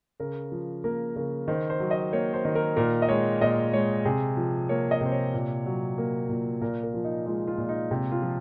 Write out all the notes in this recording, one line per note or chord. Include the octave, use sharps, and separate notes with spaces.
C#3 A#4
F3
A#3 A#4
C#3 A#4
D#3 C5
C5
F#3
D#5
A#3 C#5
C5
D#3
A#4
A#2 A#4
D#5
G#3 C#5
A#2 D#5
G#3 C#5
C3 G#4
F3
A#3 C#5
D#5
C3 C5
C#5
A#2
F#3
A#3
A#2
A#2 A#4
A#4
F3
D#4
G#3 F4
F4
A#2
D#4
C3
F4
F3